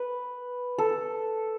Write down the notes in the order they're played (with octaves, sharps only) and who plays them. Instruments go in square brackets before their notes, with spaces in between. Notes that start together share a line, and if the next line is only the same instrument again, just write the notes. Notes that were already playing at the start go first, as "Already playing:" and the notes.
Already playing: [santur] B4
A4